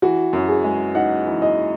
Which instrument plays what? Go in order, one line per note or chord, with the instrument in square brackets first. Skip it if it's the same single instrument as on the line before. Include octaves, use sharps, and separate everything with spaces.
[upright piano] E3 [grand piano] F#4
[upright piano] F#2
[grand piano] G#4
[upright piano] G#3
[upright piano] D#4 [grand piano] F#5
[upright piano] E3
[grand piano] D#5